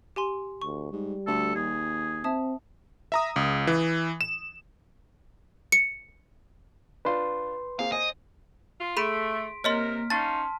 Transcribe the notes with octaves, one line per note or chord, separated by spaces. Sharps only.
G4 G#5 C6
D2 C#6
G#2 G3
D2 A4
D#2 G#4
C4 E5 A5 D#6
E5 A#5 D#6
C#2
E3
E7
C#7
D4 F4 B4 C6
A#3 C4 G#4 F5
C5 D#5 G#5
F4
A3 G#4 B5 C6 B6 D7 D#7
C3 A#3 A#4 C#5 D#5 C6 F6 B6
C#4 D#4 F5 A5 C6 A6